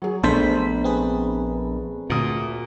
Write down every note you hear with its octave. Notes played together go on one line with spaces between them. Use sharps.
F#3 G#4
A#1 A3 B3 D4 A4 C5 B6
C4 G#4 B4
D2 A#2 D#6